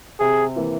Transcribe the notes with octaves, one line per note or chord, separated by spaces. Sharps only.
C3 G#4
E3 A#3